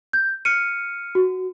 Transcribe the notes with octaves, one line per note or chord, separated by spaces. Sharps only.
G6
F6 C#7 D#7
F#4